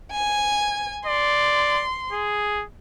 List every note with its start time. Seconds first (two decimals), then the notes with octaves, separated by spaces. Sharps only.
0.12 G#5
1.06 D5 C6
2.12 G#4